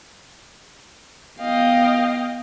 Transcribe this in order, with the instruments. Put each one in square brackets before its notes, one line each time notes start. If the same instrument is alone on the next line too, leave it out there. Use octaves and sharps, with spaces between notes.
[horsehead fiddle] B3 G5 [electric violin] D#5 F5